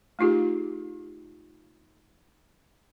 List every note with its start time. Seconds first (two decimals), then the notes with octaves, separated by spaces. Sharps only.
0.19 A3 D#4 F4 G4 G#4